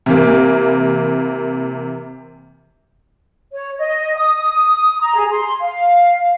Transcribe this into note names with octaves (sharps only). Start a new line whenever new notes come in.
C3 E3 A#3
C#5
D#5
D#6
A#5
G#4
C6
F5